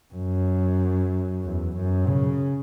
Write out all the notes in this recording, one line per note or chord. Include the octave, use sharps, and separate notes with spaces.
F#2
E2
F#2
C#3